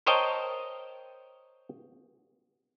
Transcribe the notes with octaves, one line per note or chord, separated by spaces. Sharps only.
A#4 C5 C#5 D#5 G5 A5